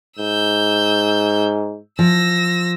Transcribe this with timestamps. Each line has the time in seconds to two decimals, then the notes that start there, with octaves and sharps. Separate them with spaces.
0.19 G#2 E6 G6
1.99 F3 E6 A#6